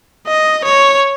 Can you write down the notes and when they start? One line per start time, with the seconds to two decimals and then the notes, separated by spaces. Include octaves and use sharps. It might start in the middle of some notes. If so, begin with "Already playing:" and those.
0.28 D#5
0.65 C#5